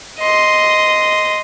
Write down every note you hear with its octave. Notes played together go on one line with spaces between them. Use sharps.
D#5 C6